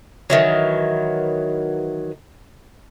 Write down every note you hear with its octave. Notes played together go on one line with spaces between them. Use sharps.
D#3 E3 F#3